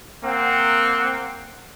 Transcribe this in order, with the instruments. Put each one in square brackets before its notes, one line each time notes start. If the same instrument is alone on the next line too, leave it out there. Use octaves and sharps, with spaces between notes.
[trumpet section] A#3 C4 F#5